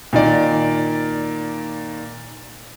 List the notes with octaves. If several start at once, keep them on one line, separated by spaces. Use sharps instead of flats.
A#2 D#3 D5